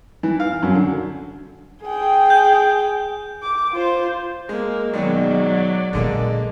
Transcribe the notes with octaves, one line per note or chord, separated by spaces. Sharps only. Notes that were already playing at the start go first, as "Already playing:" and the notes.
E3
F5
F#2
D3
G#4 G5
G6
D6
F4 C5
G#3 A#3
B2 D#3 F#3 G#3 D5
A#1 A#2 D3 G#3 A#3